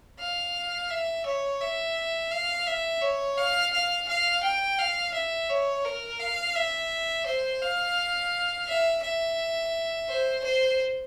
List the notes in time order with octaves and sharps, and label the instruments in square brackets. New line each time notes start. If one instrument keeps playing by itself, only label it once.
[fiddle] F5
E5
C#5
E5
F5
E5
C#5
F5
F5
F5
G5
F5
E5
C#5
A#4
F5
E5
C5
F5
E5
E5
C5
C5